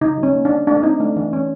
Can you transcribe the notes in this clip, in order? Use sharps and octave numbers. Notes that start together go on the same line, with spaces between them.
C#3 D#4
F#3
C#4
A#3
D4
C#4
A3 D4
D4
C4 D#4
A3 D4
E3 D4
C#4